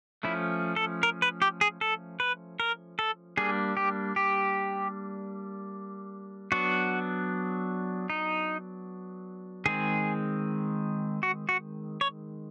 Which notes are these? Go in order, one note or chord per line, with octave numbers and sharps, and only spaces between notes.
F3 A3 C#4 E4
A4
A#4
B4
G4
G#4
A4
B4
A#4
A4
G3 A#3 D4 G#4
G4
G4
F#3 B3 D4 F#4
D#4
D#3 G#3 C4 G#4
F#4
F#4
C#5